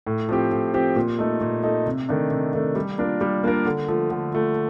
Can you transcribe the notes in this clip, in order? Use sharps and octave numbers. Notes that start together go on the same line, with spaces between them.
A2
F3 C4 G4
A2
F3 C4 G4
A#2
A3 D#4 A4
A#2
A3 D#4 A4
C3
D#3 A3 D4
C3
D#3 A3 D4
G3
A#3 D4 F4 A#4
G3
A#3 D4 F4 A#4
D3
F3 A3
D3
F3 A3